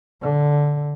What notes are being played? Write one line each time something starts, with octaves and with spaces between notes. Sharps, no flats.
D3